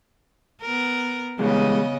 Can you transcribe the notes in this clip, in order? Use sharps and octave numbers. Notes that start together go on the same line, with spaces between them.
B3 A#4
C#3 E3 G3 G#3 B3 D#5